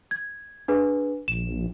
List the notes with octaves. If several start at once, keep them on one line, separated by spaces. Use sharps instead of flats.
G#6
D4 G#4 B4
A#1 E7